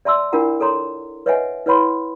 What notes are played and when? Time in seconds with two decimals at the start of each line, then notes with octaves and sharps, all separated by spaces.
0.05 D5 E5 A5 C6 E6
0.32 D4 E4 F4 A#4 F#5 A#5
0.60 A4 C#5 A#5 C6
1.26 B4 C#5 D#5 E5 F#5 G#5
1.66 E4 B4 C#5 F#5 B5 C6